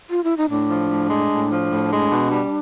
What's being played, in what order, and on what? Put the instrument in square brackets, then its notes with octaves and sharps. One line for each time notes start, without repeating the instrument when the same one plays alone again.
[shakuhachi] F4
E4
D#4
[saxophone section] A2 [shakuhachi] D4
[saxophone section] F3
A2
G#3
A2
F3
A2
G#3
B2
G3